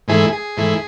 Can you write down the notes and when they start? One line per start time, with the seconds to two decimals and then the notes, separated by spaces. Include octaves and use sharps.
0.08 G#2 E3 A3 E4 G#4
0.33 G#4
0.57 G#2 E3 A3 E4